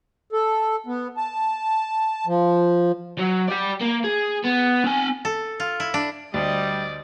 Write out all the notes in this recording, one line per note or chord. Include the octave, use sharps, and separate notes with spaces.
A4
B3
A5
F3
F#3
G4 D5
A#3
G#4
B3
C4 G#5
A4
F4
E4
D4
D2 G3 D5 D#5